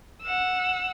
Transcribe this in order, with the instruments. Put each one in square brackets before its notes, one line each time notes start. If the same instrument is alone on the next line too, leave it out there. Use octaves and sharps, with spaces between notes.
[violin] F#5 E6